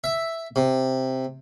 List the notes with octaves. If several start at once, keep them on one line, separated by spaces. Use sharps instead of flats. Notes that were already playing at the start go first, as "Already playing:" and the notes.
E5
C3